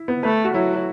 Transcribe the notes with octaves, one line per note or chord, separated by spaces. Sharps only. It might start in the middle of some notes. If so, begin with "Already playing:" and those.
Already playing: E4
B3
A3 B4
F#4
F#3 E4